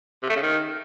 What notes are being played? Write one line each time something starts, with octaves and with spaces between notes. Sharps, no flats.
C3
A3
C#3
D#3